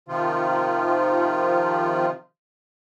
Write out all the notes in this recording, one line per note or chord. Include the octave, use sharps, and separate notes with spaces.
C3 D#3 F3 F4